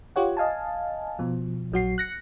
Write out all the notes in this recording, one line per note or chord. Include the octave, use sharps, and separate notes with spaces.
F4 G4 C#5 F#5
D#5 F5 G#5 A5
B2 F3
A#1 F#3 F#4 C7
F#6 A#6 C#7